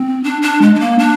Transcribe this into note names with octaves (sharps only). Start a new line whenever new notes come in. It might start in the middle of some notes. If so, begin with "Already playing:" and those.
Already playing: C4
D4
D4
G#3
G#3
A#3
D4